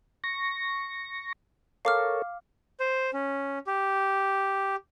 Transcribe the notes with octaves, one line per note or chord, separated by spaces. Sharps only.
C#6 A#6
A4 A#4 C#5 F5 D6 F6
C5
C#4
G4